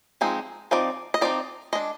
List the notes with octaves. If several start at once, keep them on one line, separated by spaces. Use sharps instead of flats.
F3 G#3 C4 D#4
F3 C4 D#4 D5
D#5
F3 C4 D#4 D5
G#3 D4 D#5